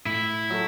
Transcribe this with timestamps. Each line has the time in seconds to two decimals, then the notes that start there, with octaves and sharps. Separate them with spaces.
0.06 A2 E4
0.50 F#3 A3